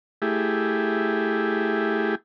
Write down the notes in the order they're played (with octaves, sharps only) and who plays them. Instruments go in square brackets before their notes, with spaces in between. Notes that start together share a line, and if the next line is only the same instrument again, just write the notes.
[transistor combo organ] A3 E4 G4 G#4